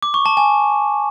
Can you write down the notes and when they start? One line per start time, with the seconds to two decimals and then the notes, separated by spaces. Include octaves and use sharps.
0.03 D6
0.14 C#6
0.26 A5
0.37 G#5